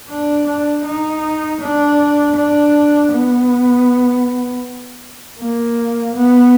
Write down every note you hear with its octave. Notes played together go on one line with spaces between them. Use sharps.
D4
D4
D#4
D4
D4
B3
A#3
B3